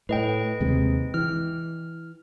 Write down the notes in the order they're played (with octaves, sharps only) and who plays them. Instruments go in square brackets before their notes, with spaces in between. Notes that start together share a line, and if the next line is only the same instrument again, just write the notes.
[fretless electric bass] A2 [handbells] B4 D#5 G5
[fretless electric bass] D#2 C3 G#3
[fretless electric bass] E3 [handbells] F6